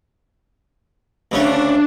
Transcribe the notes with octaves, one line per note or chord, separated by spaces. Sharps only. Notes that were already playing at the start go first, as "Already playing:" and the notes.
D2 C#3 A3 D4